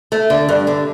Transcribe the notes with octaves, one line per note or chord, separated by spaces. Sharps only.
A3
D3
G2
D3